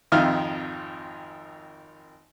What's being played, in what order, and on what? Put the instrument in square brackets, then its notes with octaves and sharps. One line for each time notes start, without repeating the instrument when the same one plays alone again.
[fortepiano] G#1 F2 D#3 F4 E5 F6